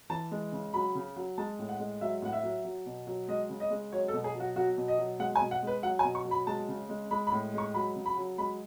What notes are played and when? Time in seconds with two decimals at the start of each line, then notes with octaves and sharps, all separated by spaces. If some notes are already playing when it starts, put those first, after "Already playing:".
0.10 E3 A5
0.31 G#3
0.52 C#3
0.74 F#3 B5
0.95 C#3
1.16 F#3
1.38 G#3 A5
1.59 A2
1.69 F#5
1.79 G#3
2.01 F#3 E5
2.22 A2 F#5
2.33 E5
2.43 F#3
2.65 F#3
2.86 B2
3.07 F#3
3.28 G#3 D#5
3.49 C#3
3.60 D#5
3.71 G#3
3.92 F#3 C#5
4.08 A4
4.13 B2
4.24 G#4
4.35 F#3
4.40 F#4
4.56 F#3 F#4
4.77 B2
4.88 D#5
4.98 F#3
5.19 G#3 F#5
5.36 G#5
5.41 B2
5.51 F#5
5.63 G#3 B4
5.83 F#3 F#5
5.99 G#5
6.04 B2
6.15 C#6
6.25 F#3
6.31 B5
6.47 G#3 A5
6.68 C#3
6.89 G#3
7.11 G#3 B5
7.27 B5
7.32 A2
7.53 G#3 C#6
7.74 F#3 B5
7.96 C#3
8.06 B5
8.17 F#3
8.38 G#3 B5